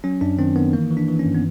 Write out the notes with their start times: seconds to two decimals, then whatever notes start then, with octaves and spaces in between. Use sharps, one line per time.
0.04 F#3 C#4
0.21 F#2 D4
0.39 D#3 C4
0.56 D#3 B3
0.73 E3 A#3
0.91 E3
0.97 D4
1.08 E3
1.19 C#4
1.26 G2
1.35 B3